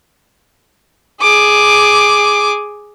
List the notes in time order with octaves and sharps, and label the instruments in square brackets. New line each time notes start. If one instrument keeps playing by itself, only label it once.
[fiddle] G#4 D6